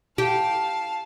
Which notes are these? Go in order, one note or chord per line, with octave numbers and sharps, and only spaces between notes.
G4 F5 A5